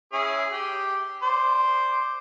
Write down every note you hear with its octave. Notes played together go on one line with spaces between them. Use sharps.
C#4 E4 G#4
G4
C5 D5